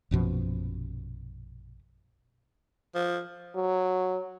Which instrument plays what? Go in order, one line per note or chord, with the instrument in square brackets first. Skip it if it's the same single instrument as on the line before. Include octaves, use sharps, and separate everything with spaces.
[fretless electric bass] A#1 F#2 B2 F3
[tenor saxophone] F3
[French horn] F#3